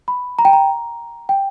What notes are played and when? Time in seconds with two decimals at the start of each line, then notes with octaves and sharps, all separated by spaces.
0.08 B5
0.39 A#5
0.45 G5
0.53 A#5
1.29 G5